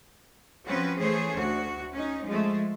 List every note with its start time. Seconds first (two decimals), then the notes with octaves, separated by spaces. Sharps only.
0.65 F3 C4 C#4 F#4 B4
0.99 E3 A3 C#4 G#4 C5 C#5
1.37 D2 F#4
1.93 C#4 D#4
2.25 F3 G#3 A3